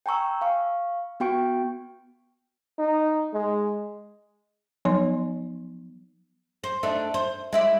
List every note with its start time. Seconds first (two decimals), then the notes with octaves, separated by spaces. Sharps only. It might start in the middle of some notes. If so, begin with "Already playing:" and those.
0.06 G5 G#5 A#5 C#6 E6
0.41 F5 C#6
1.20 B3 F#4 G5 C#6 D7
2.79 D#4
3.33 G#3
4.85 F3 F#3 B3 D#4 C#5 C6
6.64 C5
6.83 A3 D4 D#4
7.14 C5
7.53 G#3 E4 D5